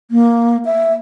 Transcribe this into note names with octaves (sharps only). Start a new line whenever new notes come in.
A#3
E5